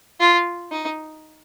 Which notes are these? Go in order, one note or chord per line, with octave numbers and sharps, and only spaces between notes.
F4
D#4